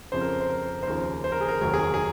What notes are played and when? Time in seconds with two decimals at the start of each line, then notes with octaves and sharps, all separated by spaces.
0.12 F2 C#3 F3 C5
0.21 A#4
0.41 C5
0.49 A#4
0.83 C5
0.87 D#2 C#3 F3 A#4
1.24 C5
1.32 A#4
1.41 G#4
1.48 A#4
1.61 F1 D#2 D#3 F#3 A#4
1.74 G#4
1.79 A#4
1.94 G#4